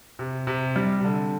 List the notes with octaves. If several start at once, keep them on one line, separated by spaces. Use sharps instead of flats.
C3
C3
G3
C3
D3